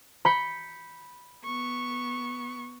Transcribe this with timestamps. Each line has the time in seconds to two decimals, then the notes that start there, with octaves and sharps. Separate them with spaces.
0.25 B5 G6 C#7
1.44 B3 C#6